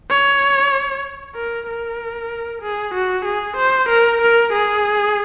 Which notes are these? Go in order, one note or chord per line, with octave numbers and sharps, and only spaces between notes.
C#5
A#4
A#4
G#4
F#4
G#4
C5
A#4
A#4
G#4